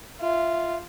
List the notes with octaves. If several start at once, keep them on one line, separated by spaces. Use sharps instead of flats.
F4 E5